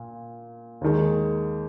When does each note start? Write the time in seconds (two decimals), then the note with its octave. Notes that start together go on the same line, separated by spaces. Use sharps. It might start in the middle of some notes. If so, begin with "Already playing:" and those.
Already playing: A#2
0.81 D#2 D#3 G#3